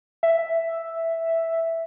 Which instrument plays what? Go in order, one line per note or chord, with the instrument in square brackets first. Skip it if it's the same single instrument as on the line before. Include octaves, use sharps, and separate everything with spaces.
[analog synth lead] E5